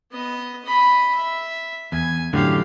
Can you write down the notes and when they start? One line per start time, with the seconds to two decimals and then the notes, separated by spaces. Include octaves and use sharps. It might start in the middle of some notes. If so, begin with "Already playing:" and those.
0.12 B3 D#5
0.65 D#5 B5
1.14 E5
1.92 E2 G#5
2.33 F#2 A2 D3 G4 F5